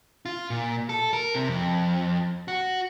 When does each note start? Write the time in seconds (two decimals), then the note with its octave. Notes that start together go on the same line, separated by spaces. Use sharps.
0.25 F4
0.50 A#2
0.89 A4
1.13 A#4
1.35 C3
1.48 F2
2.48 F#4